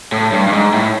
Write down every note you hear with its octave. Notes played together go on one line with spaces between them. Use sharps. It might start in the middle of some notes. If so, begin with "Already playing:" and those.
A2
G2
G2
G#2
A2